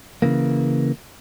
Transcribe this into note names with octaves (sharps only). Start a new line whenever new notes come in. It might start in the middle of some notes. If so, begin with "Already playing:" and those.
C#3 E3 A#3